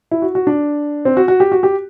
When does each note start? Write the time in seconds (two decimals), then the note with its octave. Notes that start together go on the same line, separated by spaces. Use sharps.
0.11 E4
0.22 F#4
0.35 F#4
0.47 D4
1.05 C4
1.17 F#4
1.28 F#4
1.40 G4
1.52 F#4
1.63 G4